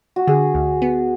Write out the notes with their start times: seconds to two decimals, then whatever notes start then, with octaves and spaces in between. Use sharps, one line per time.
0.16 F#4
0.27 D3 G#4
0.55 D2
0.82 B3